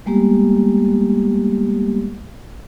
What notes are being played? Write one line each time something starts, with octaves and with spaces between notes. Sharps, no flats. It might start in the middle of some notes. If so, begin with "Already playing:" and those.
G3 G#3 A#3 B3 G4